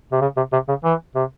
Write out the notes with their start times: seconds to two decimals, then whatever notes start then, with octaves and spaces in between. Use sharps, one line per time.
0.12 C3
0.21 C#3
0.37 C3
0.52 C3
0.68 C#3
0.84 E3
1.15 C3